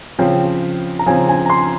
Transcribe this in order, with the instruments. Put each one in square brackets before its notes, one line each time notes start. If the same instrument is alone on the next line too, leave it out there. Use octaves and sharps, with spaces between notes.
[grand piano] C#3 F3 C4 [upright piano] G5
[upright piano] A#5
[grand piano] C#3 F3 C4 [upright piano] G#5
[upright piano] G#5
A#5
C6